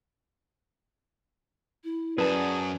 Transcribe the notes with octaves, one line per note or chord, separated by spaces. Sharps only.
E4
F#2 G#4 B4 D5 A5